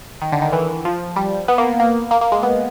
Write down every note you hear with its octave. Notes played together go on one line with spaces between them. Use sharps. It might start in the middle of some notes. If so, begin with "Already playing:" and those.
D#3
D3
D#3
E3
F3
G3
B3
A#3
A#3
A#3
A#3
G#3
B3